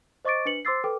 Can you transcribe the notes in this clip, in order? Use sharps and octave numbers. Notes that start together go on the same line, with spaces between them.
C5 D#5 C#6 D6 A6 D7
D4 B4 C#7 F#7
C5 C6 D6 E6 A6 C7
A4 B4 G5 D6